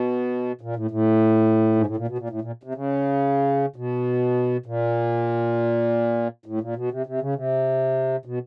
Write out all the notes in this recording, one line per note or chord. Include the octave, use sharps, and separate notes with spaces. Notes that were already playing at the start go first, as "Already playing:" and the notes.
Already playing: B2
A#2
A2
A2
G#2
A2
A#2
B2
A#2
A2
A#2
C3
C#3
B2
A#2
A2
A#2
B2
C3
C3
C#3
C3
B2